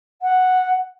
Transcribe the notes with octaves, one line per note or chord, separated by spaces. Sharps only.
F#5